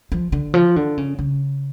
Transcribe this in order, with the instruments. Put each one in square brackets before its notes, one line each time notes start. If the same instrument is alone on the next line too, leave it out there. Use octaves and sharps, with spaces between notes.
[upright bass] F3
D3
F3
D3
C#3
C#3